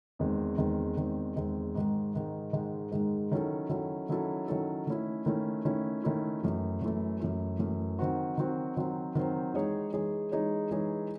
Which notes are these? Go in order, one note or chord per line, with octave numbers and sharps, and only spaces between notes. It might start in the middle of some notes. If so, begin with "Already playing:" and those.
E2 D#3 G#3 C4
E2 D#3 G#3 C4
E2 D#3 G#3 C4
E2 D#3 G#3 C4
G#2 D#3 G#3
G#2 D#3 G#3
G#2 D#3 G#3
G#2 D#3 G#3
D#3 F#3 C#4 E4 A4
D#3 F#3 C#4 E4 A4
D#3 F#3 C#4 E4 A4
D#3 F#3 C#4 E4 A4
D#3 A3 C#4 E4
D#3 A3 C#4 E4
D#3 A3 C#4 E4
D#3 A3 C#4 E4
F#2 E3 A3
F#2 E3 A3
F#2 E3 A3
F#2 E3 A3
D#3 F#3 C4 F#4 C5
D#3 F#3 C4 F#4 C5
D#3 F#3 C4 F#4 C5
D#3 F#3 C4 F#4 C5
E3 G#3 D#4 G#4 C#5
E3 G#3 D#4 G#4 C#5
E3 G#3 D#4 G#4 C#5
E3 G#3 D#4 G#4 C#5